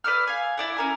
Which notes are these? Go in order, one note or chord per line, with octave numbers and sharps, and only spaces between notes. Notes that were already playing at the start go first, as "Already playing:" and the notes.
B4 D5 E6 F6
F5 G#5
E4 D5 F#5
C#4 A#4 G#5